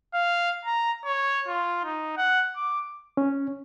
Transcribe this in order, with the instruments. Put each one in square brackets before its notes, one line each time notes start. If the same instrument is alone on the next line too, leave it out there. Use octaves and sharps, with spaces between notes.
[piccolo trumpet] F5
A#5
C#5
F4
D#4
F#5
D6
[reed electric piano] C#4